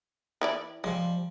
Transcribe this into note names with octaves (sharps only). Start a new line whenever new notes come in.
E3 E4 D5
F3 G3 G#3